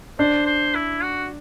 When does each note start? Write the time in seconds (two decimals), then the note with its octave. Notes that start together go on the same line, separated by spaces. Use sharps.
0.19 D4 C5
0.46 C5
0.75 E4
1.02 F#4